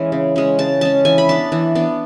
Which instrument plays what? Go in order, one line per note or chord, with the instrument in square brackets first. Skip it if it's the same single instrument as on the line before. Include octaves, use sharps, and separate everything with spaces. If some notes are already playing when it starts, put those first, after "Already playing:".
Already playing: [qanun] E3 G#3 C#4
C#3
G#3 C#4
C#3 A5
G#3 C#4 A5
E3 G#5
B5
B3 D4 A5
E3
B3 D4